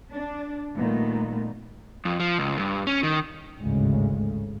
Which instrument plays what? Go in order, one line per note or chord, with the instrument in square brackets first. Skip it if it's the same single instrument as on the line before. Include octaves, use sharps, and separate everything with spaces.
[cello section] D4
A#2 D#3 G3 A3 B3
[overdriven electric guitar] F2
F3
C#2
G2
C#4
D#3
[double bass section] G#1 D2 A2 C#3 G#3